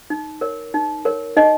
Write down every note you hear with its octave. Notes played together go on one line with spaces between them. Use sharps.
D#4
A#4 C#5
D#4
A#4 C#5
D#4 D#5